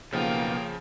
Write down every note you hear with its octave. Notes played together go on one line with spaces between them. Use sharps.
B1 C#3 F3 A#3 B3 F5 G5